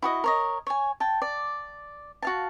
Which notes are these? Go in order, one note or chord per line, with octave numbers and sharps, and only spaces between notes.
E4 F#4 D#5
A#4 C#5 D#5
C#5 G#5
G5 A5
D5
F#4 F5 A5